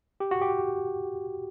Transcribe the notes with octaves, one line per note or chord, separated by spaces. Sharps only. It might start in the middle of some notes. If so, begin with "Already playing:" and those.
G4
F#4
G4